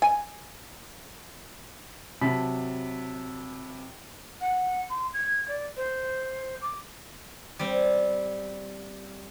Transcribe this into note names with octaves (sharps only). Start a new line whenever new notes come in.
G#5
C3 F#3 A5 B5 B6
F#5
C6
G#6
D5
C5
D6
G3 C4